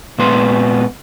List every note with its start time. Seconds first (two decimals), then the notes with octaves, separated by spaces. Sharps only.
0.18 A#2 G#3 B3 C4 B4 C6